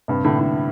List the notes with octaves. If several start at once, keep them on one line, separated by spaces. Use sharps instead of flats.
G2 C3
A2 D3
A2